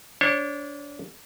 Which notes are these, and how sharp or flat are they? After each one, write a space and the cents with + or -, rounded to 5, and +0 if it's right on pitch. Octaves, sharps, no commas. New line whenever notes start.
D4 -25 C#5 -35